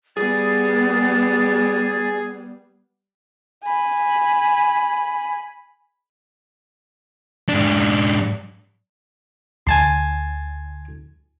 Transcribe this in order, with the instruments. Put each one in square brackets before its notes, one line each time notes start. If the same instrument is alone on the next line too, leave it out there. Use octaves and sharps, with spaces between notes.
[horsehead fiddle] G3 B3 [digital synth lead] G#4 [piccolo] A6
[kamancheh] G#5 B5
[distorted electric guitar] G#2 D4
[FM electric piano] D2 [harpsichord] G#5 A5 C6